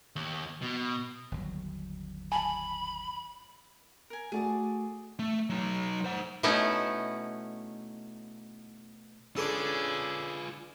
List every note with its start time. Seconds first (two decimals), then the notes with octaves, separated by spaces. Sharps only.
0.16 D#2
0.62 B2
1.32 G1 D#2 F#3
2.32 G#5 A5 B5
4.10 A#4 G#5
4.32 A3 F#4 G#4 D5 A5
5.19 A3
5.50 F#3 D#4
6.05 C5 F#5
6.43 B2 A3 B3 C#4 D#4 E4
9.37 C#4 D4 F4 G#4 A4 B4 C6 D6